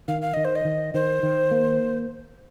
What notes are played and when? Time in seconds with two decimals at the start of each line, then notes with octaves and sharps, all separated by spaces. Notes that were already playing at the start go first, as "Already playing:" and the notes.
0.08 D#3 F5
0.22 F5
0.34 D#3 D#5
0.45 C5
0.56 D#5
0.65 D#3
0.94 D#3 C5
1.23 D#3
1.51 A#3